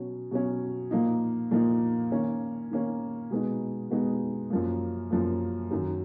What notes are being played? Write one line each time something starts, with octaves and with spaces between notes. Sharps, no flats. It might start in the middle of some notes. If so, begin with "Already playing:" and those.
Already playing: B2 F#3 C#4
B2 F#3 C#4
A#2 F3 A#3 D#4
A#2 F3 A#3 D#4
D#3 A#3 C#4
D#3 A#3 C#4
B2 G#3 B3 D#4
B2 G#3 B3 D#4
F#2 F3 A#3
F#2 F3 A#3
F#2 D#3 F#3